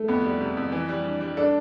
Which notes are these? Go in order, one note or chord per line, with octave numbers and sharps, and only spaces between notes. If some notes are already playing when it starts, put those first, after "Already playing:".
Already playing: A3
F2 B3
G3
C3
F2
E3
G3
D4
G3
D4 A4